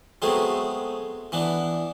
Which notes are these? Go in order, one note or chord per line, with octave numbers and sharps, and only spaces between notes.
F#3 G#3 A3 B3 C4 G#4
E3 B3 D4